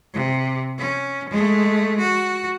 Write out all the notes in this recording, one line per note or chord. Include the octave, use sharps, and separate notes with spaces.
C3
C#4
G#3 A3
F#4